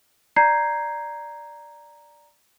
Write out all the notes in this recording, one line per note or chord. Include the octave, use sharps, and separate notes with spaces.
D5 A#5 G6 G#6 C7